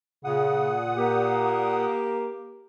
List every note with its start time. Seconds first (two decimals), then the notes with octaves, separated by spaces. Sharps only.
0.24 A#2 C#3 F#5 D#6
0.97 A#3 G4